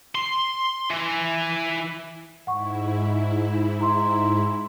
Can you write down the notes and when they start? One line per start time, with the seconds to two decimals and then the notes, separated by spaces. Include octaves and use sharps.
0.15 C6
0.91 E3
2.47 G#2 E4 F#5 C#6
3.81 A#5 C6